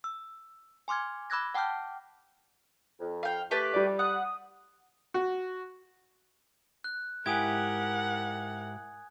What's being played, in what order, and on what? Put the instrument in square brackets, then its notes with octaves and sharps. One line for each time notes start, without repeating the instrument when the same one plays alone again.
[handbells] E6
G#5 C6 D6 F6 G#6
B5 D6 E6 F#6 G#6 A#6
F#5 G5 A5 D6 F6 G6
[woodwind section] F2
[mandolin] F5 G5
[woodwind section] A3 D6 [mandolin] G4 B4 A5
[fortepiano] G3 D5
[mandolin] F#5 [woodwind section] D#6
[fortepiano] F#4
[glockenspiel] F#6
[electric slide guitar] G#2 E4 G4 [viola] A#4 F#5 [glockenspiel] G#5 D#6 G#6